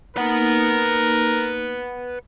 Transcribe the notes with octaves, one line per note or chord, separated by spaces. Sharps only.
A#3 D#4 A#4 B4 F#5